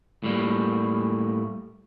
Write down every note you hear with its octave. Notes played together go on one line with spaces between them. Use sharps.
A2 G3 A#3